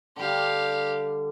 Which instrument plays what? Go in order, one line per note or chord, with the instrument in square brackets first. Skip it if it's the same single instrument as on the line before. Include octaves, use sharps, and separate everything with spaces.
[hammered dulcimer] D3 G3 [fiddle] G4 F5